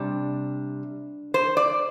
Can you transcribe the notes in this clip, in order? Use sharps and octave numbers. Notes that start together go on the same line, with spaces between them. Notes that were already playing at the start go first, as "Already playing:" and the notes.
Already playing: C3 G3 D4
C5
D5